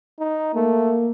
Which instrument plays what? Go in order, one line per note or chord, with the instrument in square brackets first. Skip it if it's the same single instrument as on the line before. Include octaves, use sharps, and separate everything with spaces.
[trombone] D#4
[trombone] A3 [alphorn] A#3